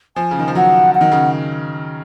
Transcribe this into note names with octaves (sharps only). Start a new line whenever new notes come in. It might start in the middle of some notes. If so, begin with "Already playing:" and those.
F3 G#5
C#3
D#3
F3
F#3 F#5
F#5
D#3
C#3